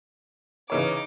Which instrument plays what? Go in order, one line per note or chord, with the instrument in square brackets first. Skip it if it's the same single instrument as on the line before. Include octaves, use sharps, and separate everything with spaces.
[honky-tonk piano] C#3 E3 C#5 [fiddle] D#4 D6